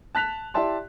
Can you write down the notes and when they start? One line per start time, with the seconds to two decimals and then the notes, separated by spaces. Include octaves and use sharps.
0.15 A5 F#6 B6 F7
0.54 E4 G4 D5 E5 A5 C6